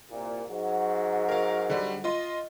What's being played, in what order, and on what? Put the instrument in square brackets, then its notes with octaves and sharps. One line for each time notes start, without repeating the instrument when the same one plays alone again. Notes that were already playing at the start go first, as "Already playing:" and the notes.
[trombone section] C2 A#2
G#2 F#3
[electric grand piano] A#4 F5
D3 G3
F4 D#5 C6